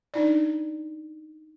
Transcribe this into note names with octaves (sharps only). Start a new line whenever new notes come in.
D4 D#4 D5